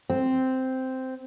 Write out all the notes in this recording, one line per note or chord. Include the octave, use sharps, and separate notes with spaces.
C4